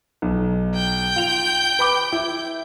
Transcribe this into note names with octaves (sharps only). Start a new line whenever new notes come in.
B1
G5 G6
F4 F7
B4 B5 D6
E4